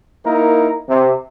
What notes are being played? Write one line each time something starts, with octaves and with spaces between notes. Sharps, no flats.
A#3 D#4 E4 A#4
C3